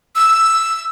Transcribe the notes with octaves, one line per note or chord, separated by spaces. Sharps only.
E6